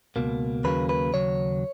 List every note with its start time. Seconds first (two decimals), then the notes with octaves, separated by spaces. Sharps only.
0.16 C#2 B2 A#3
0.64 D#2 C#3 F#3 A#3 B4
0.89 B4
1.14 D#2 C#3 F#3 C#5